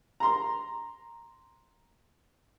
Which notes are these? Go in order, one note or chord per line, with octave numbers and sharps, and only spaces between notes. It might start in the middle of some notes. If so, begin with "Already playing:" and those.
A#5 C6